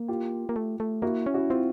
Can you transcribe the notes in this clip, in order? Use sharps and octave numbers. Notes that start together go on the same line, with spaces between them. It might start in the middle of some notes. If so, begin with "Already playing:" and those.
Already playing: A#3
F4 G4
A#3
A3
A3
A#3 E4 F#4
C#4
E4 F#4
C4 F4